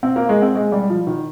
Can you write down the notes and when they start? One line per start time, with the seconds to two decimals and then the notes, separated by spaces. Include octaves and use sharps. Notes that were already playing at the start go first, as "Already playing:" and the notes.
0.03 C4
0.16 A#3
0.29 G#3
0.42 C4
0.55 G#3
0.72 G3
0.90 F3
1.07 D#3